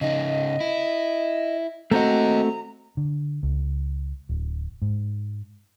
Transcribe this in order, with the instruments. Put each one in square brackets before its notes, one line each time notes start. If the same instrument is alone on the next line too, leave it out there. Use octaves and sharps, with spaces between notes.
[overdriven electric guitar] C#3 D#4 [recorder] D#5
[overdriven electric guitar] E4
[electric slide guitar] A3 C4 F#4 [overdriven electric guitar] A#3 D#5 [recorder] A#5
[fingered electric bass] D3
C#2
D1
G#2